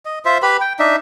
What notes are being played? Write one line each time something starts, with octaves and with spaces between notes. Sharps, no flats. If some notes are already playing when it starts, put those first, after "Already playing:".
D#5
F4 C5 E5
G4 B4 B5
G5
D4 D#4 E5